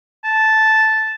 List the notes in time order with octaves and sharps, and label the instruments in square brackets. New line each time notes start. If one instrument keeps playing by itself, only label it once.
[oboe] A5